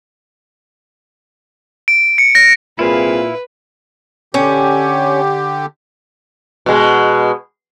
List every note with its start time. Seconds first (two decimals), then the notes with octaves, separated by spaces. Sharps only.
1.88 D7
2.18 C#7
2.35 A#6
2.79 C2 A#2 C4 E4 G#4 B4 F5
4.34 D3 C#4 G4
6.66 B2 G#3